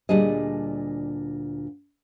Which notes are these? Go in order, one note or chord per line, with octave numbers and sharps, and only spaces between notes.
D2 A#2 G3 D4 G#4 D#5